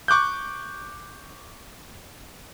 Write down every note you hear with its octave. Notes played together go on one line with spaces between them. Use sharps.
C#6 D6 F#6 G6